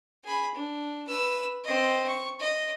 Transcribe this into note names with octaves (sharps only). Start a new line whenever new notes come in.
G#4 B5
D4
B4 E6
C4 D#5
C#6
D#5